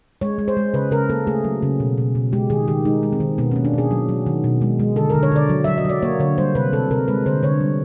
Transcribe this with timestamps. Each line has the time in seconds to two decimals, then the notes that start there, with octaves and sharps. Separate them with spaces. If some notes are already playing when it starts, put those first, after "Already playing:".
0.21 G#3 C#5
0.39 G#3
0.48 C5
0.57 G#3
0.74 C#3 B4
0.91 C#3 A#4
1.09 A#3 A4
1.27 A3 G#4
1.44 F#3
1.62 C#3
1.80 B2
1.98 B2
2.15 B2
2.33 G#3 G4
2.50 D#3 G#4
2.68 D#3 G4
2.85 G#3 D#4
3.03 G#3
3.12 C4
3.20 D#3
3.38 B2 B3
3.51 A#3 C#4
3.65 D4
3.74 B2 G#4
3.91 F#3
4.09 F#3
4.26 D#3
4.44 B2
4.61 G#3
4.79 G#3
4.96 D3 A4
5.10 D3 A#4
5.23 C#5
5.32 D3 D5
5.49 F#3
5.64 F#3 E5
5.78 D#5
5.85 F#3 D5
6.02 A#3 C#5
6.20 D3 C#5
6.38 G3 C5
6.55 C3 B4
6.73 C3 A4
6.91 C3 A#4
7.08 G#3 B4
7.26 D3 C5
7.43 D3 C#5
7.60 G3